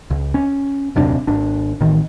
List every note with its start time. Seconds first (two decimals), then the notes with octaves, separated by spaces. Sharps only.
0.10 C#2
0.34 C#4
0.96 D#1 F#2 C3 D4
1.27 G#1 D4
1.81 A1 D#3